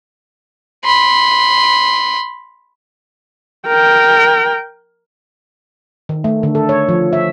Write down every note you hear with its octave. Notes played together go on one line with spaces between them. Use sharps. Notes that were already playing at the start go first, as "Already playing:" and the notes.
B5 C6
A#4 G5
D#3
A3
D3
A4
C#5
F3
E5